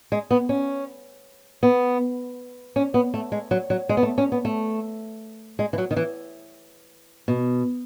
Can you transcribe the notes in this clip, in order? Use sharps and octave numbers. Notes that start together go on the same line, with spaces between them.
G#3
B3
C#4
B3
C#4
B3
A3
G#3
F#3
F#3
G#3
B3
A3
C#4
B3
A3
G#3
E3
F#3
D#3
E3
B2